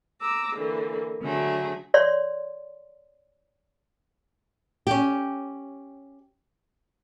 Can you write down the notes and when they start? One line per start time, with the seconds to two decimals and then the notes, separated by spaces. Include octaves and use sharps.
0.21 A#5 D6 E6
0.56 D3 E3 A#3
1.22 D3 F#3 A3 G#4
1.94 C#5 D5 C6
4.87 C#4 G4